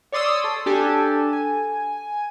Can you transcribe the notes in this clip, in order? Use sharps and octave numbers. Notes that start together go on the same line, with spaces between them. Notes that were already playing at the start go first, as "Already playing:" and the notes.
C#5 D5 C6 D#6 E6
A4
D4 G4 A4 G#5
G#5